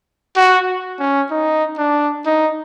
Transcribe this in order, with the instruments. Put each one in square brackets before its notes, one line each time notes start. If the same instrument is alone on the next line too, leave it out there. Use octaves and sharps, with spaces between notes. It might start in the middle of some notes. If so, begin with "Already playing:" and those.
[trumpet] F#4
C#4
D#4
D4
D#4